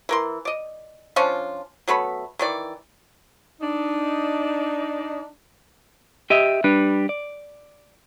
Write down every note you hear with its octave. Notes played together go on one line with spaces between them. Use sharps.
E3 A#4 C6
D5 D#5
F3 C#4 D4 F4
F#3 A3 B3 B5
D#3 E3 D5
D4 D#4
G4 D#5 E5
G3 D4 B4
D5